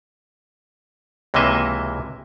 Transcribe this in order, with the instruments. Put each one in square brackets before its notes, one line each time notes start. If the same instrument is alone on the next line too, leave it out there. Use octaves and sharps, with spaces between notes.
[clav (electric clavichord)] C#2 C3 E3 A#3 D#5 E5